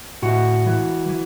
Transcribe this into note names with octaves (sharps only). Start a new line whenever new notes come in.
A2 F#4
E3
E3